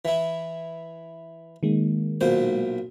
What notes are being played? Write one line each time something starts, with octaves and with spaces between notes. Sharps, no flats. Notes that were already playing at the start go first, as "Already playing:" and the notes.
E3 E4
D#3 G#3 A#3
B1 A#2 C5